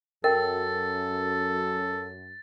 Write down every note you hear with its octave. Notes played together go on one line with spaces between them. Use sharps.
F#2 A4 A#4 G5 A6